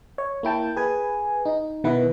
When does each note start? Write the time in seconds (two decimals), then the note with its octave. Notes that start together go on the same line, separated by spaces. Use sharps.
0.18 C#5
0.43 A#3 E4 G5 A5
0.77 G#4 B4 G#5
1.45 D#4
1.84 B2 D#3 B3 E4 B4